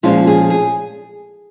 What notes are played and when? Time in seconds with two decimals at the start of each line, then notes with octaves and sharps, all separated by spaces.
0.03 A#2 F3 G#3 C#4 F4
0.27 G#4
0.50 G#4